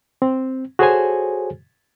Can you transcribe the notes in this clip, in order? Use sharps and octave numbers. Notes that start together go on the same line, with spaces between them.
C4
F#4 G#4 A4 C5 C#5 G#5